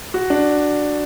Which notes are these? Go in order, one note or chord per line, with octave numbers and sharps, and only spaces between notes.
F#4
D4